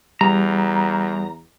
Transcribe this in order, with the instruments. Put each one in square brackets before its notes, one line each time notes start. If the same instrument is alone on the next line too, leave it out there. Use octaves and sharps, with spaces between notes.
[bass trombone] E2 [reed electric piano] G3 [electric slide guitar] A#5